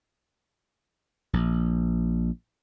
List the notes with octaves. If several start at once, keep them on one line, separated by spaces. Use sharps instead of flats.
A#1